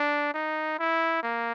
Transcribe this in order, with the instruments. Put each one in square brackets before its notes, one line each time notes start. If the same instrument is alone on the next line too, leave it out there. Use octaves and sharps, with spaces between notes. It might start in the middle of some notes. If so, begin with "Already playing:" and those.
Already playing: [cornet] D4
D#4
E4
A#3